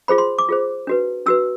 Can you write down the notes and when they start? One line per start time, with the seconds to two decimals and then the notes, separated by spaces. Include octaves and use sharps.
0.08 F4 G#4 C5 B5
0.18 C6
0.38 D6
0.49 F4 G#4 C5
0.87 D4 F#4 B4
1.26 D4 F#4 B4 E6